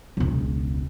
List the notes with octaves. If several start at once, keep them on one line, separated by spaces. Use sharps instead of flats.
E1 C#2